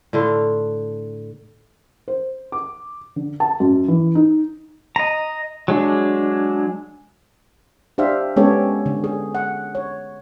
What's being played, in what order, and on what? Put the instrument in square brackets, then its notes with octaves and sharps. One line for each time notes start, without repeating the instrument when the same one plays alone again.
[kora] A2 D3 F4
[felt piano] C5
D6
D3
A5
F#2
E3
D#4
[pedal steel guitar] D#5 A#5
F#3 G#3 D4
[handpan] D4 G4 C5 E5 F5
G#3 B3 C#4 G4 A4 C#5
D3
G#4
F#5
C#5